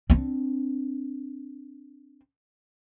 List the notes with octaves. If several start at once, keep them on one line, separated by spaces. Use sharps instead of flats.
C4 D4